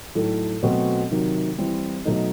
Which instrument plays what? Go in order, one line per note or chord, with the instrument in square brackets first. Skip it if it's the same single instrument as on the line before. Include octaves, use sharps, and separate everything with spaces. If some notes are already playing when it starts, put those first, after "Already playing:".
[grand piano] A2 F#3 A3 D#4 A4
B2 F#3 A3 C4 F#4
C3 D#3 F#3
E3 G3 C4 E4
B2 F#3 A3 D#4